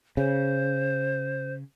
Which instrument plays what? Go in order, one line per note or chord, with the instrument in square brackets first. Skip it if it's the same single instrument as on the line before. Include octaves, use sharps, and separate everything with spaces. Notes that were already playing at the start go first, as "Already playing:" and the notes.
[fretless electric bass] C#3 [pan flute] C5